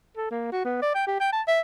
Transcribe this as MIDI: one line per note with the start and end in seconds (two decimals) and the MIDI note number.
0.17 0.28 69
0.31 0.47 58
0.52 0.64 66
0.65 0.79 59
0.82 0.94 74
0.94 1.03 79
1.07 1.16 67
1.20 1.29 79
1.32 1.42 81
1.47 1.60 76